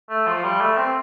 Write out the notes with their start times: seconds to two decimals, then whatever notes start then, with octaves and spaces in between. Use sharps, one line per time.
0.10 A3
0.27 F3
0.44 G3
0.60 A3
0.77 C4